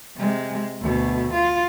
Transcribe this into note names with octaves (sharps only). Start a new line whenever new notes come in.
C3 G#3
D2 B2
F4